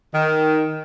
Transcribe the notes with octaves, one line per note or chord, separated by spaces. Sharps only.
D#3